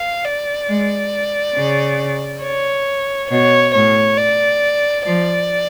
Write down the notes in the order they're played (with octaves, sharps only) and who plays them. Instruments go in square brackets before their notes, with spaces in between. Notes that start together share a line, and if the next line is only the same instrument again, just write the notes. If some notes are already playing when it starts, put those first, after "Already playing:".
Already playing: [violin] F5
D5
[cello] G#3
C#3
[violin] C#5
[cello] B2 [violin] C#5
[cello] A2 [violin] C#5
[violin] D5
[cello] F3 [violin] D5